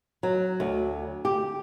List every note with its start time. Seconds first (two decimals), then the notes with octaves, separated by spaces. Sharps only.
0.23 F#3
0.60 D2
1.25 G4